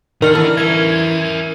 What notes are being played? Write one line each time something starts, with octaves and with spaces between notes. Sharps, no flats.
D3 D#3 A#4 D5 F6
E3 A4
A#4 E5 G#6